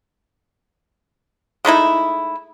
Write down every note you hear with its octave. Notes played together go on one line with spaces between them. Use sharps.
G#3 A3 D#4 E4